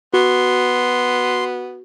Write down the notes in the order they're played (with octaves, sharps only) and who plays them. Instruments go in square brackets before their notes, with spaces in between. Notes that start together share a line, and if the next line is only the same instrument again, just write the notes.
[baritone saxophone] B3 [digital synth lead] F#4 [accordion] C6